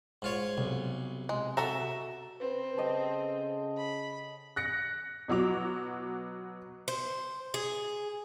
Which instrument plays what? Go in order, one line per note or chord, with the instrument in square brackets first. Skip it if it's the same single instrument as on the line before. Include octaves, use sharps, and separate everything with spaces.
[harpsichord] G#2 F4 C#5
[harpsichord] B1 [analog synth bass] C3
[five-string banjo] G#3
[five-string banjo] F#4 A4 A#5 [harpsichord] E5
[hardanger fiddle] C4 [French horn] B4
[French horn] C#3 [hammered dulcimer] A4 D#5 G5
[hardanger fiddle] B5
[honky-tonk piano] F#6 A#6 C#7
B2 F#3 F#4 D6 F7
[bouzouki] C5
G#4